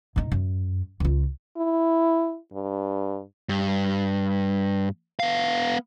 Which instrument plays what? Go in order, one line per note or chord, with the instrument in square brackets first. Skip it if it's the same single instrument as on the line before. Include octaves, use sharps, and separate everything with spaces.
[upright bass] G#2 D#4
F#2
C#2 F4
[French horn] E4
G2
[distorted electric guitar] G2
B3 F5